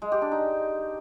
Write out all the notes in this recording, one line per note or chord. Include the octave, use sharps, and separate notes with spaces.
G#3
G4
D4
D#4